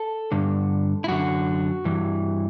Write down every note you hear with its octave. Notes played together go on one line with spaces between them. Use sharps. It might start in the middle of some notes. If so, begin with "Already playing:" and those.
Already playing: A4
G2 D3
E4
F#2 D3 F#4
G2 E3